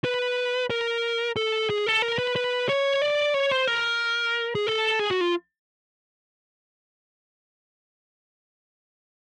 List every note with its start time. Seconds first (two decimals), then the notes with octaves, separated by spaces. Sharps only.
0.04 B4
0.70 A#4
1.36 A4
1.70 G#4
1.86 A4
2.02 A#4
2.18 B4
2.36 B4
2.69 C#5
3.02 D5
3.34 C#5
3.51 C5
3.67 A#4
4.55 G#4
4.67 A4
4.99 G#4
5.11 F#4
5.21 F4